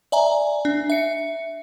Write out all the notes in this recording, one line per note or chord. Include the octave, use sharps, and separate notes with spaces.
D5 E5 G#5 A#5
D4
E5 C#7